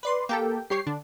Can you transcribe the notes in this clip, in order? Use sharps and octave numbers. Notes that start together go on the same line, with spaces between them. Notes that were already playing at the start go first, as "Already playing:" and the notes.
B4 D5 C6
A#3 G4 A4 G5
G3 G4 C#5 C7
D3 D4